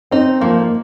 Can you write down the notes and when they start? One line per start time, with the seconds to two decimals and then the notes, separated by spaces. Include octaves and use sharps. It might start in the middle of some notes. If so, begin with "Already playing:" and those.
0.11 C4 D#4
0.41 F3 A#3
0.60 A#3